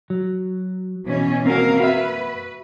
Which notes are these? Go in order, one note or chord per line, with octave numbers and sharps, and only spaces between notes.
F#3
B2 E3 C#4
A#3 C4 F#4 A#4 F5
F#4 B4 E5